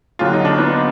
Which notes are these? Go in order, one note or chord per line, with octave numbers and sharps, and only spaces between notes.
D#2 D3 F#3 F4
D#4
D4
B3 D#4